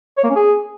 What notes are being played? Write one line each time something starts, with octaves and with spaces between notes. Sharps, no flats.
C#5
A#3
C#4
G#4